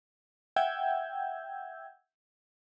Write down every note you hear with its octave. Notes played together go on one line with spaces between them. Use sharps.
E5 F#5 G5 E6 G6 G#6